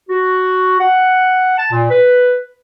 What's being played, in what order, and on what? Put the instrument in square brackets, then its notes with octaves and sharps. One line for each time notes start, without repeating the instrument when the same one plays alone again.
[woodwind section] F#4
F#5
A5
A#2
B4